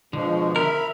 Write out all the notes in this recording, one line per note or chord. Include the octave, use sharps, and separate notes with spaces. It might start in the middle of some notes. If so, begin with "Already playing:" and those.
B2 D3 F3 G#3
A#4 E5 B5